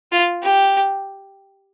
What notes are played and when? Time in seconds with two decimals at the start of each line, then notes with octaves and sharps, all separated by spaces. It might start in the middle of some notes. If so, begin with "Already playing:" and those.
0.12 F4
0.42 G4